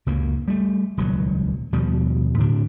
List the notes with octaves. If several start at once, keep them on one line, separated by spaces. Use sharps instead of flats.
C#2 F#2 A#3
G3 A3
D#1 C#2 B2 F#3
D#2 B2 F3 G3
A2 D3 D4